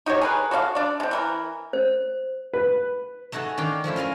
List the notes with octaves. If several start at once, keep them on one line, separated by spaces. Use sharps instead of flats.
D#4 F#4 G4 C#5
G#4 A#4 B4
F#4 A4 D5 F5
D4 D5
G#3 C4
E3 A3 A#4
C5
B4
A3 D#4 F#4 G#4 A4
D#3 D4 F5 G5
F3 A3 C#4 E4
F4 A#4 F5 G#5